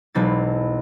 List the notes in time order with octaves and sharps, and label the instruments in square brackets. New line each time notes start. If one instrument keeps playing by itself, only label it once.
[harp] E1 B1 C4 A6